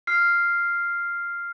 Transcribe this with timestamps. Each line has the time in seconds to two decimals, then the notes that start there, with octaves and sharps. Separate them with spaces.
0.07 F6 C7